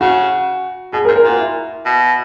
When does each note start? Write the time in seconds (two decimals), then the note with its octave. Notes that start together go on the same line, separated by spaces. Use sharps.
0.01 C#3 F#4
0.93 B2 G#4
1.05 A#4
1.08 G#2
1.16 A#4
1.24 A#2 F#4
1.39 E4
1.85 B2